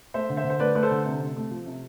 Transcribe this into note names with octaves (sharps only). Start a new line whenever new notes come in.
A3 C5 E5
D3
C5 E5
D3
C5
A3 B4 D5
A3 B4
A4 C5
D3
C3
C3
A3
F3
C3